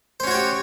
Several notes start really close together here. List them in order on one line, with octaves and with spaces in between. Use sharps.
C5 C#4 F#4 C#5 G4